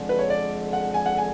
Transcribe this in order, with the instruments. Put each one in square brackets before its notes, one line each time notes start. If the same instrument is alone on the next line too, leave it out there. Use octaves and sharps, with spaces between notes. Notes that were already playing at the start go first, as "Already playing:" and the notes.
Already playing: [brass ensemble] F2 D3 G#3
[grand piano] B4
C#5
D5
F#5
G#5
F#5
G#5